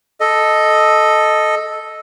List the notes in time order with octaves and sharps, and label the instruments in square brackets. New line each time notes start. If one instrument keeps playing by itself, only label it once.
[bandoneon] A4 D#5